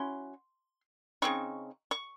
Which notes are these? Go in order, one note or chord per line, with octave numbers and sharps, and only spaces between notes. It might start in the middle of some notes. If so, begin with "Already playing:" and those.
Already playing: F#3 C#4 E4 C6
C#3 F#3 C4 D#4 C#6
C#6